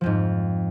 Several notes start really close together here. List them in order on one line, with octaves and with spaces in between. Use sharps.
F3 F2 G#2